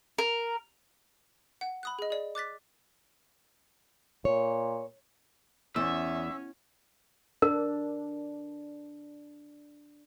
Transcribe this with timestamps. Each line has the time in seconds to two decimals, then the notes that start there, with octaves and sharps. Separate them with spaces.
0.18 A#4
1.61 F#5
1.83 B5 D#6 F#6
1.99 G#4 D#5
2.10 G#4 D5
2.35 D6 F#6 A6 B6
4.25 A#2 C#5
5.76 E2 C#4 E5
7.42 D4 A#4